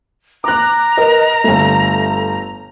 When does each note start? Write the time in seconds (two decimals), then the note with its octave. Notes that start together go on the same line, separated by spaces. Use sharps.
0.44 A#5 D6 F#6
0.97 A#4 B4 D#5
1.44 G1 A3